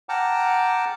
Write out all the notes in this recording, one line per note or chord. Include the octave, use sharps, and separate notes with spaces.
F#5 G5 A5 A#5 D6 F6